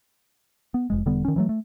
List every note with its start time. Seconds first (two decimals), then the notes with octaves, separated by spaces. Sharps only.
0.74 B3
0.90 F1 G#3
1.06 E1 D3 G3 B3
1.25 D#3 C#4
1.36 E3 F#3 A3
1.49 A3